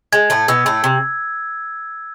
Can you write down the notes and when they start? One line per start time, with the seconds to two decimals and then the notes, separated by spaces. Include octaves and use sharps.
0.13 G#3 G#6
0.30 A2 A3
0.48 B2 B3 E6
0.66 A2 A3
0.84 C3 G#6